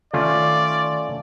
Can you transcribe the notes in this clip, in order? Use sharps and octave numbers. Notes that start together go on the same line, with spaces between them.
D#3 A3 C#4 F4 D5